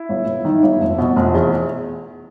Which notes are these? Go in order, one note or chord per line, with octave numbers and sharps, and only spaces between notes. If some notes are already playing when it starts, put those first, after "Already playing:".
Already playing: E4
G1
G1
D#3
G1
F1
B2
F1
E2